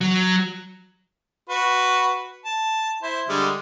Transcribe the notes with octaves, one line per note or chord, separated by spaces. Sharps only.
F#3
F#4 B4
A5
E4 C5
D3 G3 G#3